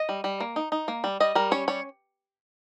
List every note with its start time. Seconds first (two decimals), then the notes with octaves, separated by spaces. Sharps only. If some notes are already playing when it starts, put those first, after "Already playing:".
Already playing: D#5
0.09 G3
0.24 G3
0.40 A#3
0.56 D#4
0.72 D#4
0.88 A#3
1.04 G3
1.20 G3 D#5
1.35 G3 A#4
1.51 C#4 C#5
1.68 G3 C#5